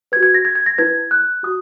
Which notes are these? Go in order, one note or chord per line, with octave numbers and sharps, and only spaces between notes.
F#4 B4 G#6
G#6
A#6
G#6
G#6
A#6
E4 B4 G#6
F#6
F#4 D#6